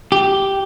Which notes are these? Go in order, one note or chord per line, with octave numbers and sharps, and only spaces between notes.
G4